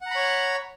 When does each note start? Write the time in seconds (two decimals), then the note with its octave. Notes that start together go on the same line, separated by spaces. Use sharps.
0.01 F#5
0.06 A#5
0.11 B5
0.16 C#5